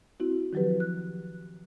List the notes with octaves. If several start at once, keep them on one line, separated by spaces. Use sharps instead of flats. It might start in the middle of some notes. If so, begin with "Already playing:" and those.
C4 E4 F#4
D#3 F3 F#3 G4 B4
F#6